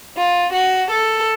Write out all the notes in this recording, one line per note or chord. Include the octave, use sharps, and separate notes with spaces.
F4
F#4
A4